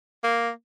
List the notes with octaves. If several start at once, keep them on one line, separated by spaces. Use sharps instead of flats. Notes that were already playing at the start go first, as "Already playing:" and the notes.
A#3